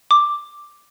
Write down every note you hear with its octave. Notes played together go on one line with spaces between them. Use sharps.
D6